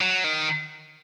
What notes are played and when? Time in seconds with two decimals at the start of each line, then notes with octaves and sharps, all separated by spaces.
0.01 F#3
0.24 D#3